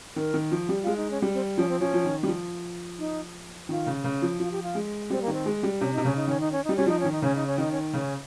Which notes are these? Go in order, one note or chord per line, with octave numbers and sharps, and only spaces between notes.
D#3 A#4
D#3
F3
G3 G4
G#3 F4
D#4
C#4
G3
C4
F3 C#4
C4
F3 C#4
F3
D#3
G3
F3
D#4
D#3 F4
C#3
C#3
F3
F3 F4
G4
F4
G#3
G3 C4
A#3
D#3
C4
G#3
G3
C3 C#4
C3 D#4
C#3 C#4
D#4
D#3 C#4
D#4
C#4
G3 D#4
G3 C#4
F3 D#4
D#3 C#4
D#4
C#3 C#4
D#4
C#4
D#3 D#4
C#4
C#3 C#4